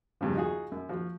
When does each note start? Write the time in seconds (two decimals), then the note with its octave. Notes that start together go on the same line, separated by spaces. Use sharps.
0.21 E2 G2 C#3 F3
0.35 D#4 F4 F#4 G#4
0.72 F#2
0.89 F3 F#4